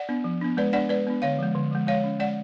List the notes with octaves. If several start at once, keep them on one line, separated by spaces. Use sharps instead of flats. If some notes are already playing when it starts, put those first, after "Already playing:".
Already playing: D5 F#5
B3 D4
F3
B3 D4
G#3 B4 D5
B3 D4 D5 F#5
G#3 B4 D5
B3 D4
D3 C#5 F5
F3 G#3
D3
F3 G#3
G#3 C#5 F5
C#4
G#3 D5 F#5